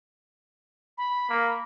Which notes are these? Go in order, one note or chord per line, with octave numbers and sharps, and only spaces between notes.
B5
A#3